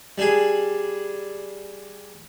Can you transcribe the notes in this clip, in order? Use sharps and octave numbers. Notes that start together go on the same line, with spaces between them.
G3 D4 G#4